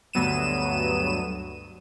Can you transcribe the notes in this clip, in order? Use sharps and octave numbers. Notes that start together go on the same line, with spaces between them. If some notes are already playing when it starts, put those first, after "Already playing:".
D2 G2 F#3 B3 D#7 E7